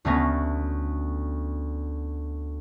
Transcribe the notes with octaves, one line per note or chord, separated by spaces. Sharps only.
D2 A3 B3 C#4 A#6